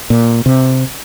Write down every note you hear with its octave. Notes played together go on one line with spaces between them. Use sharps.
A#2
C3